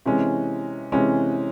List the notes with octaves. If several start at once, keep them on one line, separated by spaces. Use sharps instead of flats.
C3 E3 G#3 C#4
C3 E3 G#3 C#4